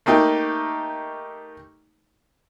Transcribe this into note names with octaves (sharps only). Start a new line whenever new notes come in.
A3 A#3 D#4 G4